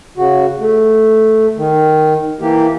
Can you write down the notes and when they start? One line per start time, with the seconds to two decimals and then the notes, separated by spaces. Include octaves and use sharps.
0.17 C#3 F#4
0.59 A3
1.57 D#3
2.40 E3 A#3 G4